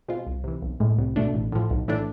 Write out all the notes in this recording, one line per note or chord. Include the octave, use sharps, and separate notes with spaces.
B2 G#3 C4 F4
C2
C3 E3
B1
A2 G#3
C2
B2 A3 D4
A1
A2 F3
B1
A2 E3 A3 D4